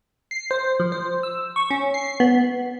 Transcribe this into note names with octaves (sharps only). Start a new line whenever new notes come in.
C7
C5
F3
C5
E6
C#6
C#4
C7
B3